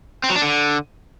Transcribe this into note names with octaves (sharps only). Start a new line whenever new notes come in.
C4
F#3
D4
D3